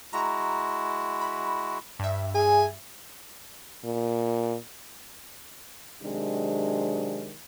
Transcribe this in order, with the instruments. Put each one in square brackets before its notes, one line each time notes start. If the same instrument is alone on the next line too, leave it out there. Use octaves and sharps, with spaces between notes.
[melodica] G#3 E4 F#4 [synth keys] A#5
[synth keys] B5
G2 E5
[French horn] G#4 [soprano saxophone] G#5
[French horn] A#2
[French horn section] C3 D#3 F#3 G#3 C4 D4